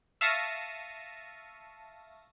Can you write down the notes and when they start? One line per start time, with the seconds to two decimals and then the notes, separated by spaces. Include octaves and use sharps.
0.21 E5 F5 A5 C#6 A#6 D#7